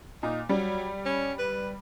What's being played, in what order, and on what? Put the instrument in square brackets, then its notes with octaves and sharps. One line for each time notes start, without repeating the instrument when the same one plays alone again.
[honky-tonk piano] A#2 [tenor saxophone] D#4
[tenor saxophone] F#3 [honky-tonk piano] G3
[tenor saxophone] C#4
B4